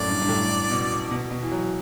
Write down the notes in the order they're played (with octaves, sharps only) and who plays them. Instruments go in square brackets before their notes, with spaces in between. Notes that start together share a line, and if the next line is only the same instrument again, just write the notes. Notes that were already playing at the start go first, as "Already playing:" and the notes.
Already playing: [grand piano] F#2 A2 [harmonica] D5
[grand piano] G2
G2
A2
B2
B2
B2
E3
F#3